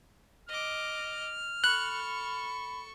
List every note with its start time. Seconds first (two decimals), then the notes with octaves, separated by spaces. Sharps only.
0.49 D#5 D6 F6
1.64 A4 B5 C#6 F#6